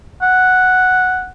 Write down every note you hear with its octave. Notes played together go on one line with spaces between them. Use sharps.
F#5